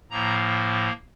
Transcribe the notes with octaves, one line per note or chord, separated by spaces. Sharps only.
A2 F3 A#3 A#5